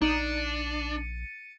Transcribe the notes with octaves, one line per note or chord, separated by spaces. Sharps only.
A#1 D4 D#4 A6 C#7 D#7